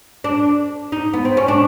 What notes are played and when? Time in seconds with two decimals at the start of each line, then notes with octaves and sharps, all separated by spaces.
0.24 D4
0.92 D#4
1.13 B3
1.25 C4
1.37 C#4
1.48 D4